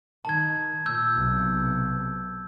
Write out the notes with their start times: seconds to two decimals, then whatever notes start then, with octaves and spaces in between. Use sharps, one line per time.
0.25 D#3 A5 G#6
0.86 A#2 E6 G6
1.18 B1 C3